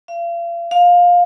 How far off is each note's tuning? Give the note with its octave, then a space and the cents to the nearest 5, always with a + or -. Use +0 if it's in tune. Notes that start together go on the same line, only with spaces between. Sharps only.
F5 -40
F5 +15